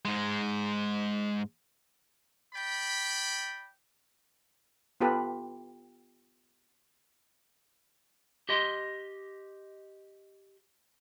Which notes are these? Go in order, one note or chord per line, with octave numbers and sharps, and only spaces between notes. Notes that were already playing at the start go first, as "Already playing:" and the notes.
G#2 G#3
D5 G5 B5
B3 F4 G4 A4 B4
G4 D#5 C6